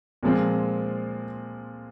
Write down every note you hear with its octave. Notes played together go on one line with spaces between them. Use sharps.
A#2 F3 G#3 C4